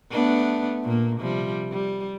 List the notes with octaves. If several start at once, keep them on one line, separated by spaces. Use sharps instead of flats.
A3 B3 D4
A#2 A#3
C3 F3 G3
G3